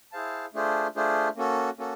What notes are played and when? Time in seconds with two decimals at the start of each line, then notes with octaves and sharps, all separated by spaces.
0.12 E4 G#4 C5 F5 A5
0.54 A3 D4 F4 G#4 C5
0.96 A3 D4 F4 G#4 C5
1.36 A#3 C#4 F#4 A4
1.79 A#3 C#4 F#4 A4